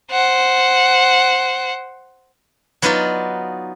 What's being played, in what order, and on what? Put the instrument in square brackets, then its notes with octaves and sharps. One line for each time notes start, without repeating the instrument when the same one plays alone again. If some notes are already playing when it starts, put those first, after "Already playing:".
[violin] C5 F#5
[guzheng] F#3 B3 D#4 F4 B4 D5